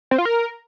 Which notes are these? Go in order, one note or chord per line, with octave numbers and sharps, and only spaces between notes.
C4
F4
A#4